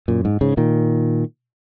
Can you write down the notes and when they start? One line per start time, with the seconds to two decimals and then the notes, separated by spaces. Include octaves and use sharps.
0.08 F#2 A#2
0.25 G#2
0.41 G#2 C#3
0.57 A#2 D#3